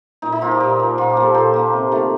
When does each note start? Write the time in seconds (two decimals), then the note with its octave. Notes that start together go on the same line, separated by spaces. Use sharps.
0.22 A#2 D#4
0.32 D#4
0.41 F3 A#3 F4
0.51 G4
0.60 A#2
0.80 F3 A#3
0.98 A#2 F4
1.10 G4
1.17 F3 A#3
1.22 A4
1.35 A#2 C5
1.54 F3 A#3
1.73 C3
1.92 D#3 A3